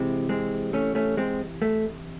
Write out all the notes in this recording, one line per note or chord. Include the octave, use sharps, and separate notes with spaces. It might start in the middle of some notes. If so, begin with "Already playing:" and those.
Already playing: C3 E3 G#3 C4
G#3 C4
A3 C#4
A3 C#4
G#3 C4
A3